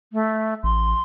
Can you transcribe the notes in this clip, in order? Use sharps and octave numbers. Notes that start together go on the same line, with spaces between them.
A3
A1 C6